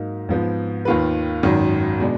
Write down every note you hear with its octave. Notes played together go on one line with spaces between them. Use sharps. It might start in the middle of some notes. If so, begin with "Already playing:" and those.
Already playing: G#2 F#3 A#3 D#4
G#2 F3 B3
D#2 D#3 A#3 F4 B4
G#1 F#2 D#3
B2 G#3 D4